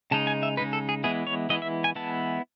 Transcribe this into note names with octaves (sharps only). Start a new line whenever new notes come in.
C#3 G#3 D#4 A5
G#5
E5
C#3 G#3 D#4 B4
A4
G#4
E3 G#3 B3 E4 G#4
C#5
E3 G#3 B3 E4 D#5
E5
G#5
E3 G#3 B3 E4 A5